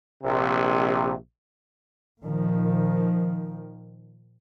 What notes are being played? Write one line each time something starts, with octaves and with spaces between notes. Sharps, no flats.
A#1 C3
A#2 D#3 F3